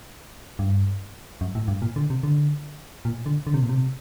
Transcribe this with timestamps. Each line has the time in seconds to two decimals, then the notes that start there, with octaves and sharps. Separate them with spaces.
0.59 G2
1.41 F#2
1.55 A2
1.68 G2
1.82 A#2
1.96 D3
2.10 C3
2.23 D3
3.05 A#2
3.26 D3
3.47 D3
3.54 C3
3.62 A#2
3.69 C3